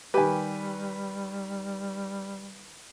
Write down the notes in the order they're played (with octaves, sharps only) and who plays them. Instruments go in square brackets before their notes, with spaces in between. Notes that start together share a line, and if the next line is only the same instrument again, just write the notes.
[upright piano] D#3 B4 [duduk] G3 [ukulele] G4 G#5